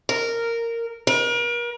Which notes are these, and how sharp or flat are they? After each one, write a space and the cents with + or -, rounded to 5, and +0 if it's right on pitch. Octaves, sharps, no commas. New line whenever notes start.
A#4 -10
A#4 +40